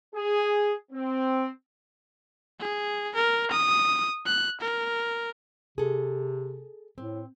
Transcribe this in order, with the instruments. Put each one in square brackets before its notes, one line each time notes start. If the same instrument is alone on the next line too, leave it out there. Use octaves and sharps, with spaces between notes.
[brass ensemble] G#4
C4
[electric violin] G#4
A#4
D#6
F#6
A#4
[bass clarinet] C3 [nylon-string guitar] G#4 A4
[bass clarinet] A2 [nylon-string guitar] C4